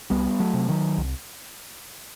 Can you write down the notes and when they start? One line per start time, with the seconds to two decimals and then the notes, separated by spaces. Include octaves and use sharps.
0.10 C2 G3 B3
0.40 F#3 A3
0.54 C3
0.69 D#3 F#3
0.98 C2